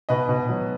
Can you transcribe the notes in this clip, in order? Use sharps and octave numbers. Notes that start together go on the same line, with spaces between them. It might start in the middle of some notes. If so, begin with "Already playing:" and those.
B2 B4 D#5
B2
F#3